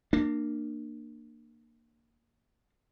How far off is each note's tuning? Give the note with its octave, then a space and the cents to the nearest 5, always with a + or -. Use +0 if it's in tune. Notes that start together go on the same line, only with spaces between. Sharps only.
A#3 -5 D4 +30